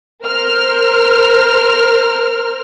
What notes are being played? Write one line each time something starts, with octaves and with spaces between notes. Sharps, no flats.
A#4 C5 F6